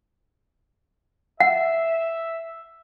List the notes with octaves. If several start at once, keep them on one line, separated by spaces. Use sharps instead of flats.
E5 F#5